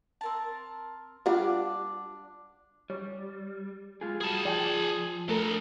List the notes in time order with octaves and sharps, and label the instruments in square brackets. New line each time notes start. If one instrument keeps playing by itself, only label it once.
[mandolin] C4 A#4 A5
[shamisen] G3 F4 F#5 [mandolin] D4 D6
[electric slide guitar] G3 [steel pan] C#5
[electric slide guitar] G#3 F4 G#4
[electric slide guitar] G3 F#4 [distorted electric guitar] G#4 A5
[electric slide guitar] F3 [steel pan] D5 G5 G#5
[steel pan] A3 A4 A#4 [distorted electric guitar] D4 D#5